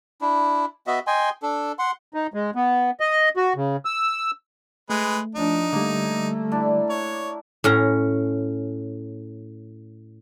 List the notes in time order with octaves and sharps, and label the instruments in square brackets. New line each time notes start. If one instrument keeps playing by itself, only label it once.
[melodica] D4 E4
B3 F#4 D#5 E5
D#5 G5 G#5 C6
D4 A4
F#5 C6
[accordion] D#4
G#3
B3
D#5
F#4
C#3
E6
[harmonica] G#3 B4 [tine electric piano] A3
[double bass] F3 D4 [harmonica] D#4
[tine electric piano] D3 G3 [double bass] A3 [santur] A#3
[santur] D4 E4
[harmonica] C#5
[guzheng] A2 C#4 A#5